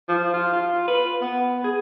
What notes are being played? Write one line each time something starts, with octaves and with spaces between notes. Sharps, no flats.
F3
F4
F4
B4
B3
G#4